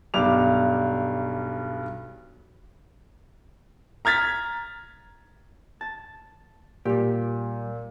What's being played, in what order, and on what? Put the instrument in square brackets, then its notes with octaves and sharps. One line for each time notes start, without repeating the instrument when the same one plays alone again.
[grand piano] B1 G2 D6 F7
A#5 F6 G#6 A6 B6
[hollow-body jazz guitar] A5
[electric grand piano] A#2 [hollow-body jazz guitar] G3 G4